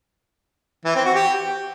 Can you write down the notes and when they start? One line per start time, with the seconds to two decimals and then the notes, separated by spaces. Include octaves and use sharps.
0.85 E3
0.95 C4
1.05 F#4
1.15 G4